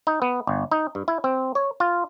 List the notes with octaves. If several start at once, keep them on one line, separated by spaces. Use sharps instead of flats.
D#4
B3
G1
D#4
G2
E4
C4
C#5
F4